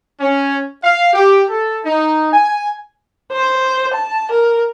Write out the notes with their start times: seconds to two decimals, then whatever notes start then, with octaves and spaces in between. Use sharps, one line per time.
0.20 C#4
0.83 F5
1.13 G4
1.50 A4
1.85 D#4
2.32 G#5
3.32 C5
3.93 A5
4.31 A#4